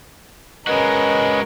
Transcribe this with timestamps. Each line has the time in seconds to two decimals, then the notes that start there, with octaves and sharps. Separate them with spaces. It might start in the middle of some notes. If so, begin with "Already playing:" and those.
0.67 G#3 C#4 F#4 A#4 B4 D#5